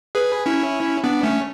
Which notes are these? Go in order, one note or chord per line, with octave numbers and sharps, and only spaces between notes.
G#4 B4
C#4 E4
B3 D4
A3 C#4